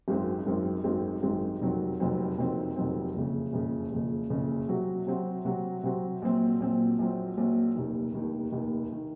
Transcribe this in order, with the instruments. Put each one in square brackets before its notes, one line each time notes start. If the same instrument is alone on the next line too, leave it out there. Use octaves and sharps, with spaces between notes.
[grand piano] G#1 F#2 D#3 G#3 C4
G#1 F#2 D#3 G#3 C4
G#1 F#2 D#3 G#3 C4
G#1 F#2 D#3 G#3 C4
F1 F2 D#3 F#3 C4
F1 F2 D#3 F#3 C4
F1 F2 D#3 F#3 C4
F1 F2 D#3 F#3 C4
F#1 F2 C#3
F#1 F2 C#3
F#1 F2 C#3
F#1 F2 C#3
C3 F#3 C4 F#4
C3 F#3 C4 F#4
C3 F#3 C4 F#4
C3 F#3 C4 F#4
A#1 A#2 F#3 C4
A#1 A#2 F#3 C4
A#1 A#2 F#3 C4
A#1 A#2 F#3 C4
F1 D#2 D#3
F1 D#2 D#3
F1 D#2 D#3
D#3